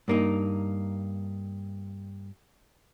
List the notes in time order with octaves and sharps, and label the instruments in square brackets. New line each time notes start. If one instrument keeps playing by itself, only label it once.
[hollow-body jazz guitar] G2 A#3 D#4